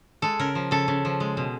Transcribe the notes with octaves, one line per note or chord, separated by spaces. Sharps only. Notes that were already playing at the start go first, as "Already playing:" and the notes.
G#3 A4
C#3 A#4
F3
C#3 A4
C#3
F3
G#3
B2